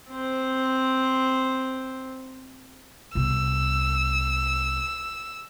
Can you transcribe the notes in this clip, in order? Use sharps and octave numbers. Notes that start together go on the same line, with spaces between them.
C4 C5
C2 B2 E6